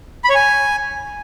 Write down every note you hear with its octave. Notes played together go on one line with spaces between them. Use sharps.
B5
C#5
G#5